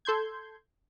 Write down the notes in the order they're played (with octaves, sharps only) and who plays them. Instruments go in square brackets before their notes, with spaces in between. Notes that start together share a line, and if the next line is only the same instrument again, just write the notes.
[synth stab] A4 C6 G6 G#6